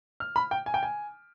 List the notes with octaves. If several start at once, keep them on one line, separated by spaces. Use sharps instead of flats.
F6
B5
G5
G#5
G5
G#5